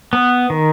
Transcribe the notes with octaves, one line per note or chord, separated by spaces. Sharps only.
B3
D#3